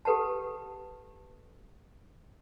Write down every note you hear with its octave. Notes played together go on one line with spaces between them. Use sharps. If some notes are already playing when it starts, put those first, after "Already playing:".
G4 A4 B4 F#5 A5